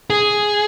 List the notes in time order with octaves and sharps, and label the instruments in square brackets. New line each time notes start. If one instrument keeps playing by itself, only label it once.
[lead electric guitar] G#4